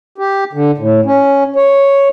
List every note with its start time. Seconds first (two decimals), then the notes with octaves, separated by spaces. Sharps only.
0.18 G4
0.53 D3
0.78 A2
1.05 C#4
1.56 C#5